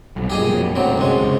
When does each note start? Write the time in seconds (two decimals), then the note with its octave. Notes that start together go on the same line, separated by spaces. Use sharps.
0.16 B1 C3
0.30 B1 G2 A#2 G4 G#4 D#5
0.50 F2 A#2 F#3
0.76 E1 A1 D2 F#3 G3 C4
0.98 C2 F#2 C3 G#3
1.21 C#2 C#3